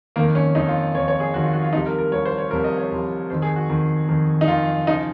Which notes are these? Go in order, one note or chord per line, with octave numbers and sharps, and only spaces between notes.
F2 D#3 A#3
C#4
F2 D#3 D#4
F4
F2 D#3 C#5
C#5
G#4
F2 D#3 F#4
F4
F#4
F4
C2 C3 F3 D#4
A#4
A#4
C2 C3 F3 C#5
C5
C#5
C2 C3 F3 A#4
D#5
C#5
C2 C3 F3
F2 D#3 C5
G#4
F#4
F2 D#3
F2 D#3
D#4
F2 D#3 F4
C#3 F3 D#4